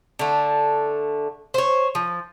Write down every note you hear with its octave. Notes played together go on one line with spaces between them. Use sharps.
D3 A3
C5 C#5
F3